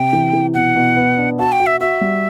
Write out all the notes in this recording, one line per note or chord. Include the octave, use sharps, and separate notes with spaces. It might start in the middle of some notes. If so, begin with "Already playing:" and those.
Already playing: C3 G5
E3
E3
B2 F#5
B2
B3
D4
F#4 A5
G5
F#4
E5
F#4 E5
G3